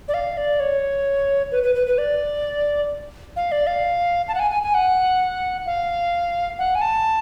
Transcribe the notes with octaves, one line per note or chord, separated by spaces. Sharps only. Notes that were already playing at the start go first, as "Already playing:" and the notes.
D5
F5
D5
C#5
B4
B4
B4
B4
D5
F5
D5
F5
A5
F#5
G#5
G#5
G#5
F#5
F5
F#5
G#5
A5